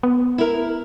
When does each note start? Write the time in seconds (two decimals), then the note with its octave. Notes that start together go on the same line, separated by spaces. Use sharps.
0.03 B3
0.38 E4 A#4